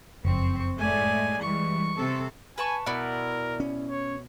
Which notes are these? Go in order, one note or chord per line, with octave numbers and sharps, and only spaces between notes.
F#1 F2 C4 C#6
A2 G#3 A3 D5 G#5
E3 G3 G#3 C#6
C3 C4 A4
B4 G#5 A5 C#6
B2 E4 A#4 D5 F#5
C#4
C#5